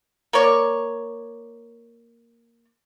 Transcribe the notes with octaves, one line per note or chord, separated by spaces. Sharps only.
A#3 A#4 C#5 D5